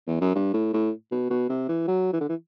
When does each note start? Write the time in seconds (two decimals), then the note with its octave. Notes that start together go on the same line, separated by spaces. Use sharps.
0.07 E2
0.21 F#2
0.35 G2
0.54 A2
0.73 A2
1.11 B2
1.30 B2
1.49 C3
1.69 E3
1.88 F#3
2.13 E3
2.21 D3
2.29 E3